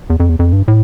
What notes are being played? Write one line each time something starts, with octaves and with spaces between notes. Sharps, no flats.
E2
F2
E2
F2
G2
A2